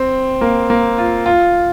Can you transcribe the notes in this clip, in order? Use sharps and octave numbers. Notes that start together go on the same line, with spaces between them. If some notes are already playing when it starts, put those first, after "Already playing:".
Already playing: C4
A#3
A#3
F4
F4